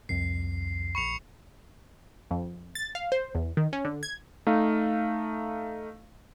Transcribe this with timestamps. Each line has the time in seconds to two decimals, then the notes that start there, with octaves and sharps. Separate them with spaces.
0.09 C2 F2 C7
0.95 A#1 B5 C#6 C#7 F7
2.31 F2
2.75 A6
2.95 F5
3.12 C5
3.35 E2
3.57 D#3
3.73 C#4
3.85 D3
4.03 G#6
4.47 A3 D#4 F5